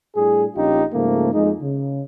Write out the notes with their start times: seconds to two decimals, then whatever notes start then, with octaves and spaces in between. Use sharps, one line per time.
0.16 A2 G3 D4 G#4
0.55 A#1 C#4 D#4 F4 G4
0.93 G#2 C#3 F3 A3 A#3
1.33 F2 G#3 D#4
1.62 C#3